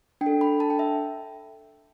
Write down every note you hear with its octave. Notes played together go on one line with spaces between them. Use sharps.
D4 G5
A4
B5
A5
G5
E5